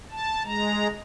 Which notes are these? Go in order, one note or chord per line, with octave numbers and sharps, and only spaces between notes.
A5
G#3 A#5